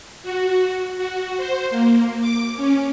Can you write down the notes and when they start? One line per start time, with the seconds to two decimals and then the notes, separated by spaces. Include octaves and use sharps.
0.23 F#4
0.97 F#4
1.37 C5
1.70 A#3
2.21 D6
2.57 C#4